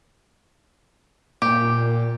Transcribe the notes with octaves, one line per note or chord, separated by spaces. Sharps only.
A#2 G4